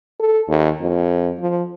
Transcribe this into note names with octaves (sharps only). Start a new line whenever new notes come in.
A4
D#2
F2
F3